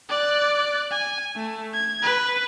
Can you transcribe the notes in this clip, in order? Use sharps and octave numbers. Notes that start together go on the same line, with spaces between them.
D5 F#6
G#5
A3
G#6
B4